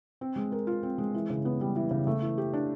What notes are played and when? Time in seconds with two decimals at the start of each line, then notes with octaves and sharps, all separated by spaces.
0.21 C4
0.36 G#3
0.52 A#4
0.67 F4
0.83 C4
0.98 G#3
1.14 E3
1.30 C#3
1.45 B3
1.61 G3
1.76 E3
1.91 C#3
2.07 A3
2.22 E3
2.38 G4
2.53 D4